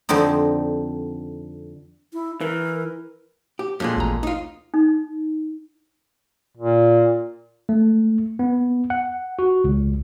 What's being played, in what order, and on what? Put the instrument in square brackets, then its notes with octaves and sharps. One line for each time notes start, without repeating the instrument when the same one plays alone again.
[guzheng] F2 D3 C4 D#4
[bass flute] E4
[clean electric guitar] E3 [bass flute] A#4
[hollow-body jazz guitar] G4
F2 A#2 G#3
[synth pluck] A1 D2 A#5
[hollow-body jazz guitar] D#4 F4
[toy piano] D#4
[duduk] A#2
[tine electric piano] A3
B3
F#5
F#4
C#2